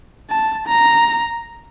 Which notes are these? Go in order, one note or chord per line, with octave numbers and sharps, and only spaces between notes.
A5
A#5